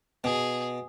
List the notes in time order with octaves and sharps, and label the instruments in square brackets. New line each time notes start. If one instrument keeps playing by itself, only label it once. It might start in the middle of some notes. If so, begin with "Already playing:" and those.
[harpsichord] B2 [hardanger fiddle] G#4